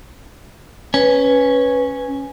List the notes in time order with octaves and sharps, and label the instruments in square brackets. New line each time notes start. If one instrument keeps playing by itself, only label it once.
[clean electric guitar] C#4 [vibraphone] B4